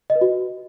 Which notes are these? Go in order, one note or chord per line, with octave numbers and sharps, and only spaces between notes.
D#5
B4
F#4